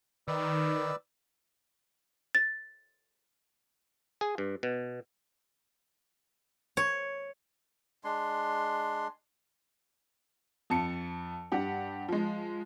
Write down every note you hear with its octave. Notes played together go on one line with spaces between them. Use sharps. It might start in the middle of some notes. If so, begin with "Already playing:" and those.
D#3 B4 D5 E6
A6
G#4
G2
B2
C#5
G#3 D4 C6
F2 A5 C#7
G2 G4 F#5
F3 G#3